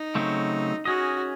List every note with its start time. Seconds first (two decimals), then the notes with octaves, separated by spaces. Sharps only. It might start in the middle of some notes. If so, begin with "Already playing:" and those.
Already playing: D#4
0.15 C#3 F#3 A3 C4
0.85 C#4 F#4 G#4 D#5